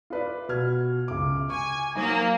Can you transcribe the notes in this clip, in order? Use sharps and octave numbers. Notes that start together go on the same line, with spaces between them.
F4 B4 D5
B2 F6 G#6
C#2 D6
G#5 C#6
F#3 A#3 D#4 C5